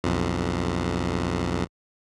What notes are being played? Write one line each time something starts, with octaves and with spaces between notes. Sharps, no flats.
B1 F2